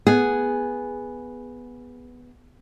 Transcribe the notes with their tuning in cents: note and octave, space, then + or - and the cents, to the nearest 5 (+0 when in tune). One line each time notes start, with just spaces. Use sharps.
B3 +0 G#4 -5